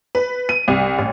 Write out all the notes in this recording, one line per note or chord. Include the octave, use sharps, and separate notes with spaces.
B4
D#7
C2
A1